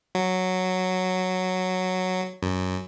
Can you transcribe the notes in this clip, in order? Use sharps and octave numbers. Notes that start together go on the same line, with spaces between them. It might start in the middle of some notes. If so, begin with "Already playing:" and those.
F#3
F#2